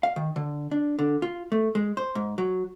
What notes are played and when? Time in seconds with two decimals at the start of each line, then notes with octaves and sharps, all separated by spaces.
0.03 F5
0.16 D#3
0.36 D3
0.71 D4
0.99 D3
1.22 F4
1.52 A3
1.75 G#3
1.97 C5
2.15 G#2
2.38 F#3